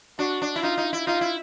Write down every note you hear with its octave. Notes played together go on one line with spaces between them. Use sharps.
D4 F#4
D4
E4
D#4 F4
D#4
E4
D#4 F4
E4